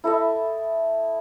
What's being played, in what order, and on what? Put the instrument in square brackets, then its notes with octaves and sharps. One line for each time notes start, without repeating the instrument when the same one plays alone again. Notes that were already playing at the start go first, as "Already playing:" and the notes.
[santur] E4 A4 D#5 E5